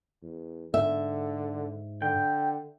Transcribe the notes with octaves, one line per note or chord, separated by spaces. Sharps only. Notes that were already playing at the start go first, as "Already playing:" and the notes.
E2
G#2 D3 E5
D3 G5